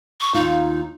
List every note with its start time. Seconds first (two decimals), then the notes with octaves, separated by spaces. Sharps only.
0.21 C#6
0.34 D#2 D#4 F4